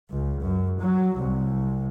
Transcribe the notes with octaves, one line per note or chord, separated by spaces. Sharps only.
C#2
F#2
F#3
C2